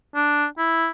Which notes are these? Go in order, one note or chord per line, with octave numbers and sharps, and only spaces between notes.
D4
E4